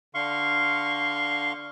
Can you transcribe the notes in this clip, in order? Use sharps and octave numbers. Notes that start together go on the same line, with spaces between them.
D3 F5 C6 C#6